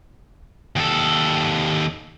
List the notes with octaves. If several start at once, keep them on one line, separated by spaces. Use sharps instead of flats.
D#2 A4